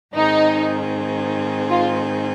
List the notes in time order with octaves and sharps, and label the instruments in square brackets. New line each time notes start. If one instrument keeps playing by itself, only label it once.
[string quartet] G#2 D#3 C4 G#4 [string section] D#4
[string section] F4